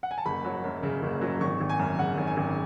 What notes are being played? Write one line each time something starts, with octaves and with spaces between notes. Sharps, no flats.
F#5
G#5
A5
F#1 B5
F#3
F#2
C#3
F#1
F#3
G#1 C#6
G#1
G#5
F#2
C#3 F#5
G#1
G#5
G#1